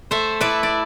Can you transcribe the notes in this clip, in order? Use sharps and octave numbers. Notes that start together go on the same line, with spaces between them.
A3 C5 E5
E4 B4 D5
D5